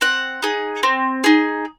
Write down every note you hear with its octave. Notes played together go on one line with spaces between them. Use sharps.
C4 F#5
D#4 G#4
C4
D#4 G#4